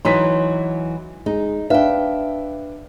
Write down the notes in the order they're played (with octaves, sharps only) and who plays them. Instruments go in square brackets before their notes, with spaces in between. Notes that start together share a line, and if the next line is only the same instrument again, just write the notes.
[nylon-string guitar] E3 F#3 D#4 [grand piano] C6 B6
[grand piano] G#3 [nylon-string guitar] D#4
[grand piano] D4 B4 F5 [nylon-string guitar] E5 G5